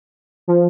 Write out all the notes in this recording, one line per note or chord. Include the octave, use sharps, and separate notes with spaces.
F3